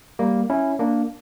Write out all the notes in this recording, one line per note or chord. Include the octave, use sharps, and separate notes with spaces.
G3 A#3
C#4 E4
A#3 D4